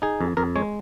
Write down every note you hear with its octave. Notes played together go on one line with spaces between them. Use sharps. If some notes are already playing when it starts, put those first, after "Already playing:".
D#4 G#4
F2
F2 A#4
G#3 C#5